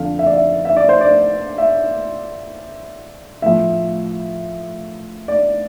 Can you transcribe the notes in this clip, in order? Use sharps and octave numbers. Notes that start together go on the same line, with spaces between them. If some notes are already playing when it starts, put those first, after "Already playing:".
Already playing: F2 D3 F3 F5
E5
D5
E5
E5
D5
C5
D5
E5
A2 F3 E5
D5